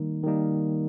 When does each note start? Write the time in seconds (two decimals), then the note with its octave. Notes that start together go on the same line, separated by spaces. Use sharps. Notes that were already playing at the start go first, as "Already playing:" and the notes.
Already playing: D#3 G3 A#3 D#4
0.24 D#3 G3 A#3 D#4